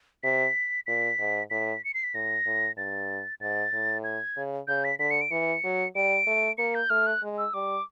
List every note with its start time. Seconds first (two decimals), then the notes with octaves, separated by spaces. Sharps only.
0.23 C3 B6
0.86 A#2 B6
1.19 G#2
1.50 A2 B6
1.84 C#7
1.94 C7
2.04 B6
2.14 A2 A#6
2.46 A2
2.77 G2 A6
3.41 G#2 A6
3.73 A2
4.04 G#6
4.37 C#3
4.68 C#3 G6
4.84 B6
4.99 D3 B6
5.11 C#7
5.21 D7
5.31 E3 C#7
5.64 F#3
5.95 G3 D7
6.27 A3
6.58 A#3 C#7
6.75 G6
6.90 A3 F6
7.07 F#6
7.22 G#3
7.38 E6
7.54 G3 D6